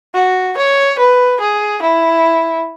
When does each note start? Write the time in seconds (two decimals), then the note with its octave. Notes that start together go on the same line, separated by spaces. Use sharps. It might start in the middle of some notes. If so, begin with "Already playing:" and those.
0.14 F#4
0.57 C#5
0.98 B4
1.40 G#4
1.82 E4